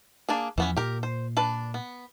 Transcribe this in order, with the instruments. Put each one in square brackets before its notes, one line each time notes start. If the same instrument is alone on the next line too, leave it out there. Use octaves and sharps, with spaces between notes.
[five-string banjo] A#3 D4 G#4
[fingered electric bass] E2 F3 [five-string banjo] E3 B3 C#4
[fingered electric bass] A#2 [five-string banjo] G4 A#4
[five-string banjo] C5
D4 B4 A5
B3